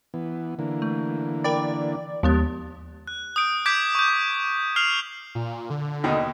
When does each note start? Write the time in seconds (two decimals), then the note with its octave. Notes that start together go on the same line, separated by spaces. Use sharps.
0.14 E3 B3
0.59 D3 E3 A#3
0.82 A3
1.44 A#4 D5 G5 B5
2.23 D#2 F3 G#3 B3
3.07 F#6
3.36 D#6 G6 D7
3.66 D6 G6 G#6 B6 D7
3.95 C#6 G6
4.08 D6
4.76 F6 C7 F7 F#7
5.35 A#2
5.70 D3
6.04 D#2 B2 D#4